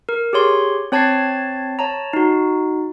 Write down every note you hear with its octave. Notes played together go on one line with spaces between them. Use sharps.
A#4
G4 G#4 C#5 C6
C4 C#5 A5 G#6 A6 C7
C#5 A5 A#5
D#4 F#4